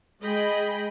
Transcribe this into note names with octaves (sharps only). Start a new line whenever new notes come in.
G#3 G#4 D#5 G5 B5